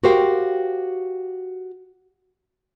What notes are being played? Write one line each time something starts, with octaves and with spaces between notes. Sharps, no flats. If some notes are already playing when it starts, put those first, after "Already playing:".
F#4 G4 A#4 C5 F5 G5